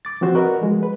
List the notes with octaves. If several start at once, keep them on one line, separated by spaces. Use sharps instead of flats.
D6 A6
F3 C4 F#4 C5
F#4 A#4 B4 D5 D#5
F3 G#3
B4